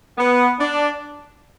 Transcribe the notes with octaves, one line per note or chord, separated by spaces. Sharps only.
B3
D4